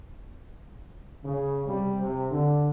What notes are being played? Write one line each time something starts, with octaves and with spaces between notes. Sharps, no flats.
C#3
C3 G3
C3
D3